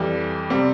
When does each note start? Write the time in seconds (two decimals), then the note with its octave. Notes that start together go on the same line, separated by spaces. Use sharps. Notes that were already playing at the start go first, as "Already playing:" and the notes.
Already playing: F2 E3 G3
0.50 C3 G3 C4